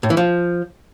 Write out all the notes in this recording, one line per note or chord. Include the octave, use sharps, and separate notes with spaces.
A2
E3
F3